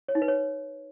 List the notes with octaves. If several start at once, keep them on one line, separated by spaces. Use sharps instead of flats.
C#5
D#4
B4
C#5